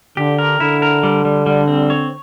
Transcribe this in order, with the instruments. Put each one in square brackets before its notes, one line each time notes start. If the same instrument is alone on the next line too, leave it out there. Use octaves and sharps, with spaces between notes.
[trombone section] D3 [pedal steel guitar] G4
[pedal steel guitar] A#4
[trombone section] D3 [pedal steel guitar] E4
[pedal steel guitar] A#4
G3
G3
G3
C4
C#5